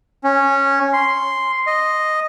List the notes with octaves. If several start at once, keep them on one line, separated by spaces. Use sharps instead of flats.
C#4
C6
D#5